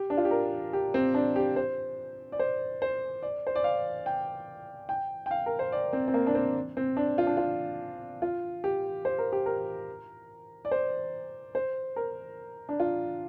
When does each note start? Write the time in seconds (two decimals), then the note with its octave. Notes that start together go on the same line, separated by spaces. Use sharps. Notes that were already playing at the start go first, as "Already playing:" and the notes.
Already playing: G4
0.10 D4
0.18 F4
0.25 G4
0.31 A#4
0.73 G4
0.94 C4
1.14 D4
1.36 G4
1.56 C5
2.32 D5
2.39 C5
2.82 C5
3.22 D5
3.47 C5
3.55 D5
3.64 F5
4.06 G5
4.89 G5
5.26 G5
5.31 F5
5.46 A#4
5.59 C5
5.72 D5
5.93 C4
6.08 C4
6.14 A#3
6.27 D4
6.35 C4
6.77 C4
6.97 D4
7.18 F4
7.27 D4
7.37 F4
8.22 F4
8.64 G4
9.05 C5
9.18 A#4
9.33 G4
9.46 A#4
10.65 D5
10.71 C5
11.55 C5
11.96 A#4
12.69 D4
12.80 F4